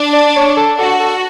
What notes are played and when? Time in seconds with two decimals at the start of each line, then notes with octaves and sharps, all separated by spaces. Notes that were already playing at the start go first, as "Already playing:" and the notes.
Already playing: D4
0.13 D5
0.36 C#5
0.57 A4
0.79 F#4 A4
1.00 A4